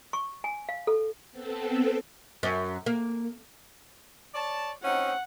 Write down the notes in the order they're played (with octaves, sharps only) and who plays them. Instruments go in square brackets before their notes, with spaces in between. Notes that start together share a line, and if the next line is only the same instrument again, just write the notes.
[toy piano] C#6
G#5
F5
A4
[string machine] B3 C4 A4
[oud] F#2
A#3
[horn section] C#5 D5 A5
[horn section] C4 C#4 D#4 [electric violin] F#5